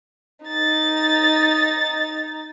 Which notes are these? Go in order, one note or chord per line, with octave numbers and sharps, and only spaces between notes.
D#4 A6